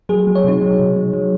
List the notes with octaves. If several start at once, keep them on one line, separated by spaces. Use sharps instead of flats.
F#3 G#4
F#3
C#5
C3 D#4
F#3
C3
F#3
F#3